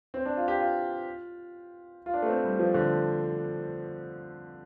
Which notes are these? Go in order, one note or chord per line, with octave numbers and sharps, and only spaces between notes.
C4
D4
F4
G4
F4
F4
D4
A3
C4
G3
F3
D3